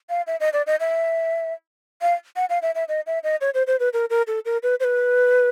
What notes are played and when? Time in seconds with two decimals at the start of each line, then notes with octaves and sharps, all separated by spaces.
0.10 F5
0.27 E5
0.40 D#5
0.53 D5
0.67 D#5
0.80 E5
2.02 F5
2.36 F#5
2.50 F5
2.62 E5
2.75 E5
2.88 D#5
3.07 E5
3.24 D#5
3.41 C#5
3.54 C5
3.67 C5
3.80 B4
3.93 A#4
4.10 A#4
4.27 A4
4.45 A#4
4.63 B4
4.80 C5
4.84 B4